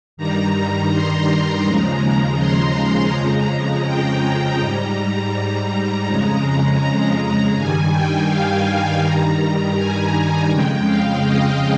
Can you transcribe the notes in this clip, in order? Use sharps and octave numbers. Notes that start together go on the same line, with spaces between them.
G2 D#3 G3 A#5
C6
D#2 C#3 F3 G#3 A#5
C6
F2 C#3 F3 G#3 A#5
G5
G#2 G3 A#5
F2 C#3 G#3 A#5
A#5
A#5
G2 D#3 G3 G#5
G5
F5
G2 D#3 G3 A#5
G#5
F2 C#3 G#3 G5
F5
D#5